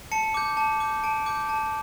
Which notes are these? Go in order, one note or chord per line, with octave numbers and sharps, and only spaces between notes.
A5 C#7
D6 G6
A5
D6 G6
A5 D7
D6 G6
A5